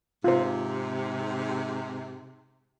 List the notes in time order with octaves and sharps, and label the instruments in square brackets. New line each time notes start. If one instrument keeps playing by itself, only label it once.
[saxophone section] G#2 C3 [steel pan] F4 C5